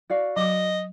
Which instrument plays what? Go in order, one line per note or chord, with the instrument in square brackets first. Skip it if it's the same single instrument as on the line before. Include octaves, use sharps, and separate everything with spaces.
[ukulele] F#4 D5 F5
[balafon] F#3 D6 [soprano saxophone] D#5